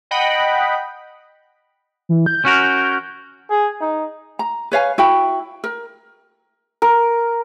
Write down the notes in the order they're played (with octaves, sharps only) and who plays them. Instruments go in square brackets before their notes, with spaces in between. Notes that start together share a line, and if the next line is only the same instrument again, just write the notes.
[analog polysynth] D#5 F#5 G5 B5
[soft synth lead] E3
G6
[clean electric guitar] C#4 F#4 A#4
[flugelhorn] G#4
D#4
[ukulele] A#5
B4 C#5 F5 G#5
E4 F#4 G5 B5
A#4
[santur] A#4